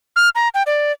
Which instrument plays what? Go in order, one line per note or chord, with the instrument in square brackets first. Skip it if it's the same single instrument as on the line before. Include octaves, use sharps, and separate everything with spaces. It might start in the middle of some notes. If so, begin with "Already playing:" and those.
[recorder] F6
A#5
G5
D5